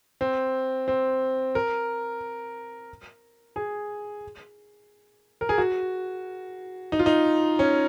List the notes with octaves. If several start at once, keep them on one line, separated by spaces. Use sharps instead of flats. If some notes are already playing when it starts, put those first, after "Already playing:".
C4
C4
A#4
G#4
A#4
G#4
F#4
D#4
F4
D#4
C#4